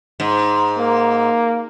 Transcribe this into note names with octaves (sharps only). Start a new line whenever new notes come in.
G#2
A#3